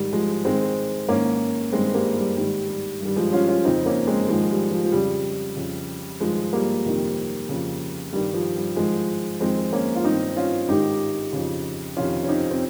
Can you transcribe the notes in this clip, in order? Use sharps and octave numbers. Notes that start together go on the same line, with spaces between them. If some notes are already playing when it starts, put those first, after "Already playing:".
Already playing: G#2 D#3 G3
F3 G#3
G#2 D#3 G#3 C4
G#2 D#3 A#3 C#4
G2 D#3 G#3 C4
G3 A#3
G3
G#2 D#3 G3
G3
G2 D#3 G3
F3 G#3
C#4 F4
C#4 F4
F2 C#3 C4 D#4
A#3 C#4
G#3 C4
G#2 D#3 F3 G#3
G3
F3
F3
F2 C#3 G3
F2 C#3
G2 D#3 F3 G#3
G3 A#3
F2 C3 D#3
F2 C#3
G2 D#3 G3
F3
G3
G#2 D#3 F3 G#3
F2 D#3 G#3 C4
A#3 C#4
F4
G2 D#3 C4 D#4
C#4 F4
G#2 D#3 D#4 G4
F2 C#3
F2 C3 D#3 C#4 F4
C#4
C4 D#4
C4